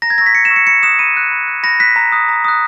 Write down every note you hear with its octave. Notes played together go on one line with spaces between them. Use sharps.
A#5 A#6
G#6
C#6 E6 A#6
B6
A#5 C#7
E7
C#6 E6
C#7
B5 C#7
D#6 F#6 E7
B5 D#7
D#6 F#6
B5
F#6
B5 A#6
F#6 B6
A#5
D#6 F#6
A#5
D#6 F#6